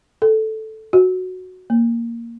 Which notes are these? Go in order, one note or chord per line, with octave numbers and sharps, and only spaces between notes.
A4
F#4
A#3